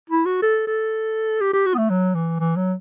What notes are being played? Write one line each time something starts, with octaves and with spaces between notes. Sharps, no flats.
E4
F#4
A4
A4
G4
G4
F#4
B3
A3
F#3
E3
E3
F#3